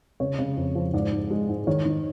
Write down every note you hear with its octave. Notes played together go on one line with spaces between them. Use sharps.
C#3 C#5
C#3
F2
F3
G#2 D5
G#2
G#3
G#2
D#3 C#5
D#3